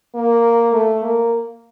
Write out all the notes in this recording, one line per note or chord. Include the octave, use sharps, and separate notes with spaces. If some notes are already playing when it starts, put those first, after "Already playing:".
A#3
A3
A#3